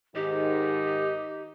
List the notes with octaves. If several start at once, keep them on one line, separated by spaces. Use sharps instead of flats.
G#2 D#3 D#4 G4